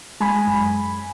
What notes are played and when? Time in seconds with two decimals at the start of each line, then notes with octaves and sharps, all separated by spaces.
0.20 G#3 G#5 B5
0.47 F#2
0.72 F#2